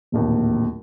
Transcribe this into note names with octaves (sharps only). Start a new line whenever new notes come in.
D1 A#1 D#2